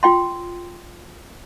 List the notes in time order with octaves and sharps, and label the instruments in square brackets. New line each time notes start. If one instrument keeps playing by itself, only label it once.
[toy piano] F4 G5 C6